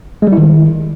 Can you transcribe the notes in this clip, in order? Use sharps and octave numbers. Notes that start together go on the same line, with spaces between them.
G#3
G3
E4
D#3